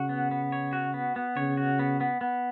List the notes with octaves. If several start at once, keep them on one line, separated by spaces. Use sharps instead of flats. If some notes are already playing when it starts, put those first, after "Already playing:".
Already playing: C#3 F#4
B3
B3
C#5
F#4
B3
B3
C#3 C#5
F#4
B3
B3
B3